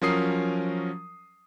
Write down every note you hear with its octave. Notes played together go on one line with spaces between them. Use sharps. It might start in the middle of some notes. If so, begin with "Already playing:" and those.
F3 F#3 C#4 A#4 D#6 C7